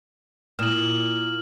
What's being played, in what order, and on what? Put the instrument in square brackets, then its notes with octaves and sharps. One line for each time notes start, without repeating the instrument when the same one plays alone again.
[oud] A#2 [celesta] E4 D#6 E7 [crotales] F6 F#7